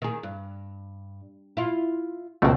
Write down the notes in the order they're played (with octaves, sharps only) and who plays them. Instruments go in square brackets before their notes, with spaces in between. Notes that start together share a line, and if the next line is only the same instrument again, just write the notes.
[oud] D#3 G#4
G2
E4 F4
[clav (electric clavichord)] C#2 B2 A3 [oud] F#2 C4